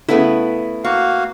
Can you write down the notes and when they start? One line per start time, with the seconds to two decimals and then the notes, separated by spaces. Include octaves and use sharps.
0.09 C#3 A3 B3 E4 B4
0.84 A#3 F#4 F5 C#6